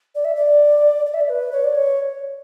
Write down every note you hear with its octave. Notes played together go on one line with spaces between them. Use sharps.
D5
E5
D5
D5
E5
D5
B4
C#5
D5
C#5